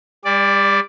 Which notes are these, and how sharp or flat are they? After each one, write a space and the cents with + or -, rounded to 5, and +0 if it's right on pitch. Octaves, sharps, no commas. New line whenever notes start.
G3 +35 D5 +0